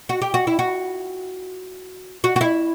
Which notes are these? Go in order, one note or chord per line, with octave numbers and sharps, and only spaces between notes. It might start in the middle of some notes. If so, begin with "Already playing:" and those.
F#4
G4
F#4
E4
F#4
F#4
F#4
E4